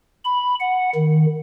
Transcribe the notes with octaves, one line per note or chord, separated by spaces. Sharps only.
B5
F#5
D#3